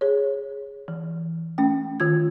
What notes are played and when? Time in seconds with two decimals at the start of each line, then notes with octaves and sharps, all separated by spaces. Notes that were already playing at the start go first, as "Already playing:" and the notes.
0.01 G#4 C#5
0.88 E3
1.58 A3 C#4 G5
2.00 D#3 F4 G#6